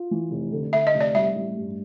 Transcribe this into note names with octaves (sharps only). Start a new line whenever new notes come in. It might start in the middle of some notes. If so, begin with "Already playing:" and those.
Already playing: F4
E3
F1
D3
D3 E5
D#5
F1
D5
G3 E5
A1
G2